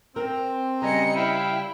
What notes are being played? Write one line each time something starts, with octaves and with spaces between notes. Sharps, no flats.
C4 A#4
C#3 G3 G#4 B4 D#5 A#5 C#7
E4 F5 G5